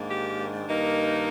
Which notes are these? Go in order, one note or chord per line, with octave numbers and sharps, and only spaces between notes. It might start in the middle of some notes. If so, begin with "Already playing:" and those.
Already playing: G#2 D#3 A#3 D4
G4
G2 D#3 A#3 D#4